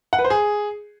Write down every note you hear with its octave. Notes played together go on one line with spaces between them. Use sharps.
F#5
B4
C5
G#4